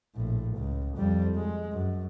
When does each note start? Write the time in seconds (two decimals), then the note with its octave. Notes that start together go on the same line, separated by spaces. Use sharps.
0.15 A#1 A2
0.57 C#2
0.97 F2 G3
1.36 G#3
1.73 F#2